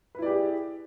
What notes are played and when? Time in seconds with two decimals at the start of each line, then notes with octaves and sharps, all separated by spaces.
0.15 B4
0.18 E4
0.22 D5
0.26 G4
0.30 G#4